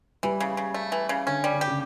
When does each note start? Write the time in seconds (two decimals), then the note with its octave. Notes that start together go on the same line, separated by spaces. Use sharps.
0.23 E3 G3
0.40 C#3
0.57 C#3
0.74 A3
0.92 E3
1.09 C#3
1.27 D3 C#4
1.44 G3
1.53 D3
1.61 G4
1.66 C#3